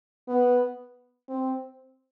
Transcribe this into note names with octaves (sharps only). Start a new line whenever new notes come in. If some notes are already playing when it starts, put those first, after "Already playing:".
B3
C4